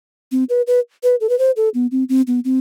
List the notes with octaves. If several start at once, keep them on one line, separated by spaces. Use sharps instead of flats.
C4
B4
B4
B4
A4
B4
C5
A4
B3
C4
C4
B3
C4